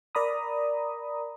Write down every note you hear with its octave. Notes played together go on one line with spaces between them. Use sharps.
A#4 D5 A#5 B5 D#6